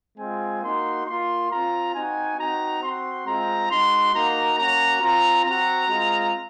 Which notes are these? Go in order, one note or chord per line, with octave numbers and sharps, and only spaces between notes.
G#3 C4 F4 G#5
A#3 D#4 F#4 C6
A#3 F4 C6
F4 A#5
C4
C4 D#4 F#4 G#5
C4 D#4 F#4 A#5
C4 F#4 C6
G#3 C4 F4 A#5
G#3 D#4 F#4 C6
A#3 D#4 F#4 A#5
A#3 C#4 F#4 A#5
C4 F4 A#5
C4 F#4 A#5
G#3 C4 F4